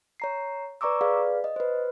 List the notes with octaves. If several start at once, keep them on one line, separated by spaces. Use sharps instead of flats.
C#5 A#5 C7
B4 D5 A#5 C#6 D6 E6
G#4 B4 D5 F5
D#5
B4 C5